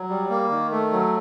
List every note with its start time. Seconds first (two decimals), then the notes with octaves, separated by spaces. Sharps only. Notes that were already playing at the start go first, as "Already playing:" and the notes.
Already playing: F#3
0.09 G3
0.30 A#3
0.50 D#3
0.72 A3
0.92 F#3